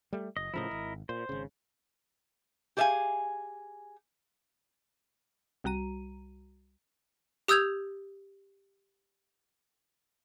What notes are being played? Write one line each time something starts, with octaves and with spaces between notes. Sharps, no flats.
G3 A3
F#1 D#5
A2 C#3 F3 E4 A#4 D#5
G#1
A#2 C5
G#1 C#3
G4 G#4 D5 E5 F5 G#5
C2 G3 F#4 A#5 D#7
G4 D#6 E6 G6 G#6 F7